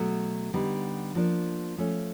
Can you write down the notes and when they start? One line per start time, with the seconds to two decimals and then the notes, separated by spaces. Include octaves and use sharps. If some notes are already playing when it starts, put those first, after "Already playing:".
Already playing: B2 F#3 A3
0.53 D3 G3 B3 D#4
1.15 F3 A#3 D4
1.77 F3 A3 C#4